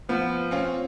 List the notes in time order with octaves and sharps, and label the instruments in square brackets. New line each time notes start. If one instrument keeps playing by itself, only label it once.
[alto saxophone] F3 [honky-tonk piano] B3
[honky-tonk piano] C4 C#4 F4